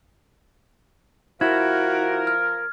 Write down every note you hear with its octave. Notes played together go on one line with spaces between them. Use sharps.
F3 E4 F#4 A#4 G#6
F6